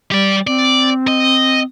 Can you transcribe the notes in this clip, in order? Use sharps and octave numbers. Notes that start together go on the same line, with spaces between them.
G3 G4 D5
C4 D5
D#5